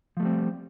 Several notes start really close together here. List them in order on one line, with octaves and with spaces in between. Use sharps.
F3 A3 G3 C4